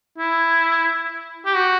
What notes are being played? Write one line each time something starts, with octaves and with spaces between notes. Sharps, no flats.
E4
G4
F#4